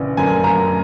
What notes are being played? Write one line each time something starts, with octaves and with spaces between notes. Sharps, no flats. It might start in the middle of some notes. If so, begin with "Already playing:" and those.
Already playing: A#1 C#3 E3
F#2 G#5
F#2 A#5